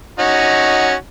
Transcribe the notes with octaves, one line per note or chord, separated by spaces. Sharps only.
C#4 D#4 F#4